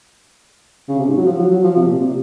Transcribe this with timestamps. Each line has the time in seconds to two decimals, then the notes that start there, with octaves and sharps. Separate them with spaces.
0.89 C#3
0.99 C3
1.08 G#2
1.17 F#3
1.26 F3
1.39 F#3
1.51 F#3
1.64 F3
1.77 C3
1.88 A#2
2.01 C3